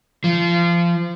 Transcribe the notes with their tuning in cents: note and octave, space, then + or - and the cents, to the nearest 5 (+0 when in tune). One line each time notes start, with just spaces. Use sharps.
F3 -25